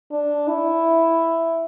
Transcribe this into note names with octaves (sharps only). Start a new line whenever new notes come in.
D4
E4